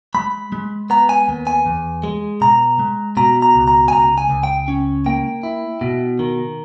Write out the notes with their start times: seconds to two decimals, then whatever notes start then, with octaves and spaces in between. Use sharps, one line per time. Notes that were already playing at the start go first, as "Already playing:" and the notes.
0.15 G#3 B5
0.52 G#3
0.90 B3 A#5
1.09 G#5
1.28 D#2
1.47 G#5
1.66 E2
2.04 G#3
2.41 B2 A#5
2.79 G#3
3.17 B2 A#5
3.42 A#5
3.54 C#2
3.68 A#5
3.88 G#5
3.93 C#2 A#5
4.18 G#5
4.30 C#2
4.43 G5
4.68 C#4
5.06 A#3 G5
5.43 E4
5.81 B2
6.19 D#3